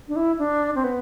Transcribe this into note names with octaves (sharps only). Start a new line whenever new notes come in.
D4
E4
D4
C4
B3